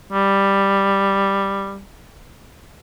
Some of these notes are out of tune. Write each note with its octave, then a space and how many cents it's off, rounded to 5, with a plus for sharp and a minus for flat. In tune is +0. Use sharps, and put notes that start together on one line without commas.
G3 +5